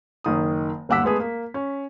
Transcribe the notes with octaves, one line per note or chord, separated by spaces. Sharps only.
F#1 D#3 D#6
G1 D#2 F#5 D6 E6 B6
G#3 A3 B3 G#4
A#3
C#4